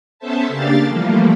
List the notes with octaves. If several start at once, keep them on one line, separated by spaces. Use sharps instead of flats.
B3 C#4 A4 C5 E5 A5
C#3 A#3 D4 G4 F5 A6
E3 F3 G3 A3 A#3